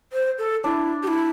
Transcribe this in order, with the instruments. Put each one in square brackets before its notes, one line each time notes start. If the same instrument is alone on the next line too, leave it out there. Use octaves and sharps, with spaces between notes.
[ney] C5
A4
[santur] D4 [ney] E4
[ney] G4
E4